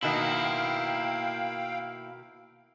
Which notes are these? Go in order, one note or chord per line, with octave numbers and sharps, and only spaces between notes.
B2 D#3 A#3 E4 F5 G5